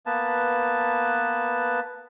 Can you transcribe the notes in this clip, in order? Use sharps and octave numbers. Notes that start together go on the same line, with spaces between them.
A#3 B3 B4 A5